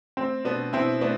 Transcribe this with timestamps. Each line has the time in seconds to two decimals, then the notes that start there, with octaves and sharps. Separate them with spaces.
0.17 A3 C4
0.44 B2 B3 D4
0.73 B2 C4 E4
1.01 A3 B3 D4